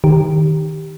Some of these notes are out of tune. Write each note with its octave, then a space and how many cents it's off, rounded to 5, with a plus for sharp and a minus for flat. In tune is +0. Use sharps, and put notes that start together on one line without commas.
D#3 +0 G4 +0